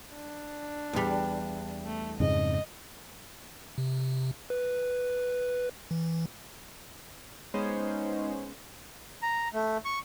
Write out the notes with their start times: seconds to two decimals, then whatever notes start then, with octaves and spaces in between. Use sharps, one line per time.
0.14 D4
0.93 E2 G3
1.85 A3
2.20 F2 G#2 C#3 D#5
3.78 C3
4.50 B4
5.91 E3
7.54 G#3 B3 C#4 D#4 C5
9.22 A#5
9.53 A3
9.85 C#6